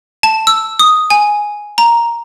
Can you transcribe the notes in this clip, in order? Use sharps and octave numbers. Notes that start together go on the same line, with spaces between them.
A5
E6
D#6
G#5
A#5